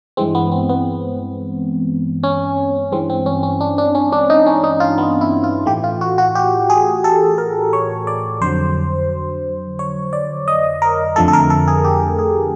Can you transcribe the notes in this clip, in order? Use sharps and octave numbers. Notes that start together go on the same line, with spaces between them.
G2 E3 G#3 C4
B3
C4
B3
C#4
G2 E3 G#3 C4
C4
C#4
C#4
D4
D4
C#4
D4
D#4
C#4
D#4
F4
B3
E4
F4
A2 E3 A3 G4
F4
F#4
F#4
G4
G#4
A4
A#4
C#5
D5
F2 D3 F#3 C5
C#5
D5
D#5
A#4
F2 D3 F3 A3 A4
A4
A#4
A4
G#4
G4
G#4